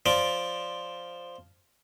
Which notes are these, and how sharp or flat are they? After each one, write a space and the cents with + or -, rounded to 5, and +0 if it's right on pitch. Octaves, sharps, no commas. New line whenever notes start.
F3 +0 D5 +0